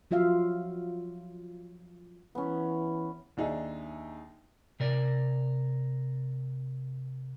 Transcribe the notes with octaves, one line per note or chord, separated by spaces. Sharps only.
F3 F#3 F4 E5 F5
E3 B3 C#4
D#2 D4 D#4 G#4 E5
C3 A#4 D5